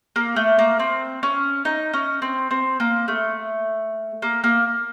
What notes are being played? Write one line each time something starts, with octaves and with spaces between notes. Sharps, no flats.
A#3
A3
A#3
C4
C#4
D#4
C#4
C4
C4
A#3
A3
A#3
A#3